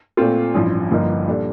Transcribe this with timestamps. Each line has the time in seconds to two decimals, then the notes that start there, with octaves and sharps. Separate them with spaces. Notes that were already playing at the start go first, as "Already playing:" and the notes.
0.17 A#2 A3 C4 F4
0.54 A1 G2 F3
0.91 G1 G2 F3 A#3 D#4
1.27 A#2 G3 D4 A4